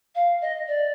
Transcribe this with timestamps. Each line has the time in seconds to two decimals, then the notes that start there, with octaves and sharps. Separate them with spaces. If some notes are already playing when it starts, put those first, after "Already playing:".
0.15 F5
0.41 D#5
0.67 D5